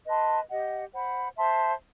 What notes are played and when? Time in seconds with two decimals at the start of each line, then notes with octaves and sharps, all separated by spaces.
0.05 B4 D#5 A5 C6
0.49 G4 D#5 F#5
0.93 C5 F#5 B5
1.37 C5 E5 A5 C6